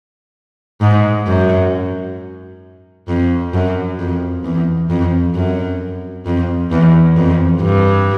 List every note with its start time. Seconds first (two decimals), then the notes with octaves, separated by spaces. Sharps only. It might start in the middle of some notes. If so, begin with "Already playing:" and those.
0.81 G#2
1.27 F#2
3.08 F2
3.54 F#2
3.99 F2
4.44 E2
4.90 F2
5.35 F#2
6.26 F2
6.71 E2
7.16 F2
7.61 G2